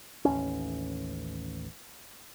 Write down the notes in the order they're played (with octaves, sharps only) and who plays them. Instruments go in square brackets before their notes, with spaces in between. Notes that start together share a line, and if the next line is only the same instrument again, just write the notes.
[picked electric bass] A1 D#2 C#4